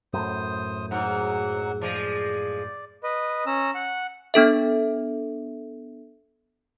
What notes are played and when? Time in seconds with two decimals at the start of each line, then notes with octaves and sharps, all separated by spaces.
0.13 F#2 A2 C5 D#6
0.91 G#2 F#3 F#5
1.82 F3 G#3 D5
3.03 B4 D#5
3.46 C#4 A#5 E6
3.75 F#5
4.34 B3 D4 A4 E5